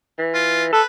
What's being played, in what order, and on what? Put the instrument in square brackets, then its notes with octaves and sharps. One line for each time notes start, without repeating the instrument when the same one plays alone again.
[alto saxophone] E3
[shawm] F4
[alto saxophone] A4 [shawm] B4